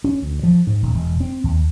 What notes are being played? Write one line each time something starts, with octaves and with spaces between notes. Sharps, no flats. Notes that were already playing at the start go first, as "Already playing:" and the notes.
C#4
D2
F3
G#2
D#1
E1
C4
D#2